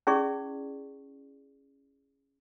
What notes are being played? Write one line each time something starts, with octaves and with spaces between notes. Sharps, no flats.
C#4 E4 G#4 D5 C#6